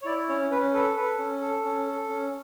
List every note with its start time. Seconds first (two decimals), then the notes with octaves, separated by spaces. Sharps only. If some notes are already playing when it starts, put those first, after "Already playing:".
0.02 C#5
0.05 E4 D5
0.29 C#4 C#5
0.51 C#4 B4
0.73 A4 B4
0.96 A4 B4
1.18 C#4
1.41 A4
1.65 C#4
1.86 A4
2.09 C#4